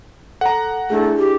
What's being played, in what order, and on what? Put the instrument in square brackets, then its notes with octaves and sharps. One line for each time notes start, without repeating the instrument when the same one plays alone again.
[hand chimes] A4 [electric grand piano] F#5 A#5
[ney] A3 [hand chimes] D4 E4 G#4
[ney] G4